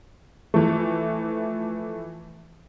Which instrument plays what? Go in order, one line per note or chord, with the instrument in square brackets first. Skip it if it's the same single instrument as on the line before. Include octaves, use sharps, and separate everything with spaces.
[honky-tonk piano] E3 F3 A3